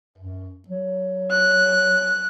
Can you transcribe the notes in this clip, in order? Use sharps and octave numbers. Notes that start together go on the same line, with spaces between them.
F#2
F#3
F#6